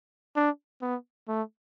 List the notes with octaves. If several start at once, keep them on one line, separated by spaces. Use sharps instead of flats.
D4
B3
A3